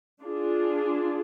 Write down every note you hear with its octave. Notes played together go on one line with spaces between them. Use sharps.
D4 F4 G#4